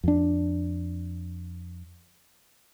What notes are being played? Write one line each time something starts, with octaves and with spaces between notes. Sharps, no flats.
F2 D4